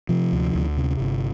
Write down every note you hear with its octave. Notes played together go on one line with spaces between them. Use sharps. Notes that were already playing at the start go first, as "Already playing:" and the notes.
C3 F3
D2
D2
C3
G1